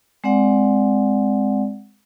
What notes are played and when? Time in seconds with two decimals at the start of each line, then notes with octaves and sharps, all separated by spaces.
0.24 G#3 C4 D5 F#5